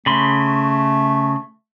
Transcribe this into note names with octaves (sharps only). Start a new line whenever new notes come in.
C#3 A3 B5 C6